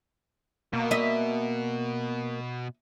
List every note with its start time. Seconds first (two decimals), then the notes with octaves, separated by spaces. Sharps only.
0.73 B2 A#3
0.91 D#5 E5